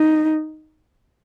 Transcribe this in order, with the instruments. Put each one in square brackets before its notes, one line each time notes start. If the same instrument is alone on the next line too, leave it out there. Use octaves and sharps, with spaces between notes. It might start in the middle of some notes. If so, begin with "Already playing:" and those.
Already playing: [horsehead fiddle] D#4